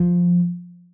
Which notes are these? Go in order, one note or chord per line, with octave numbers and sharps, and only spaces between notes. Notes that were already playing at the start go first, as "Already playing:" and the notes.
Already playing: F3